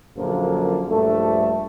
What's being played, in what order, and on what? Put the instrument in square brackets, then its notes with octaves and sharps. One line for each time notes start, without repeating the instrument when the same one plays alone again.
[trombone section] A#1 F#2 D3 F3 A#3
A#1 G2 A3